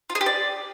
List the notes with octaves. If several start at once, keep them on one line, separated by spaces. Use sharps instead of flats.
F4
G#4
G4
D5